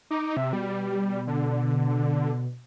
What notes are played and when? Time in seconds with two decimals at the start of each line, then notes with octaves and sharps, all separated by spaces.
0.11 D#4 D6
0.37 C3 E5
0.53 B2 G3
1.27 D3